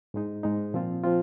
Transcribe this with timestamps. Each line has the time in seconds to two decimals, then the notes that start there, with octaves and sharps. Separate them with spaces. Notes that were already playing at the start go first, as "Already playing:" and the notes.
0.14 G#2 G#3 D#4
0.43 G#2 G#3 D#4
0.74 A#2 F3 C4 F4
1.04 F3 C4 F4